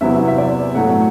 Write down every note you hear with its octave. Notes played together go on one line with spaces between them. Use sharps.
E2 C3 F#3 B3 E4 E5
E5
D5
A2 F#3 A3 F#5